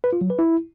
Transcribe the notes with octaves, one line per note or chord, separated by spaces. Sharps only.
B4
F4
F#3
B4
E4